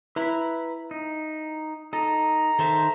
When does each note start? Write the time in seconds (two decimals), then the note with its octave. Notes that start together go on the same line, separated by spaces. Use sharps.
0.16 E4 B4 A#5 B5
0.91 D#4
1.93 D#4 A4 A#5
2.59 D#3 A4 C5 E5 A5